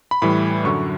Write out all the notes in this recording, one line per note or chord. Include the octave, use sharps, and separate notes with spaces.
B5
A2 E3 G3 B5
F#2 D3 F#3 C#6